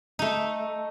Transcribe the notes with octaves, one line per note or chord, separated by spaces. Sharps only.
A3 D#4